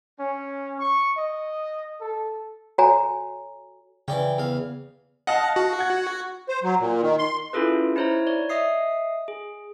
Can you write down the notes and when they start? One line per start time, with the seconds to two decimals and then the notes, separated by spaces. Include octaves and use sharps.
0.20 C#4
0.80 C#6
1.17 D#5
2.00 A4
2.78 F#4 A4 C#5 G#5 A#5
4.08 C#3 E3 D5 G5
4.38 E2 F5
5.27 D#5 F5 F#5 A5
5.56 F#4
5.79 F#5 G#6
6.49 C5
6.63 F#3
6.80 A#2
7.02 D#3
7.19 C6
7.53 C#4 E4 F4 G#4 A4 B4
7.96 D#4 E4 C5 C#5 A#5
8.27 C#5 D5
8.49 D#5 E5 D#6 C7
9.28 G#4